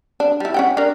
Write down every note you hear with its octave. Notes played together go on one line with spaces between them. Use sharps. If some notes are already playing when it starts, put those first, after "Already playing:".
D4
G3 E4
C#4 F#5 G5
D4 A#4